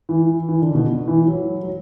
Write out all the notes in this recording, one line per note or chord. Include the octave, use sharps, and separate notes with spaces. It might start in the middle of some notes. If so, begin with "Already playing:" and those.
E3
E3
D3
B2
E3
F#3
F#3